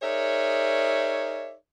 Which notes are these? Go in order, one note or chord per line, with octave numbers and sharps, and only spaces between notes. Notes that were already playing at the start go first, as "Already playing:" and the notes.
D#4 G#4 A#4 C#5 D5 E5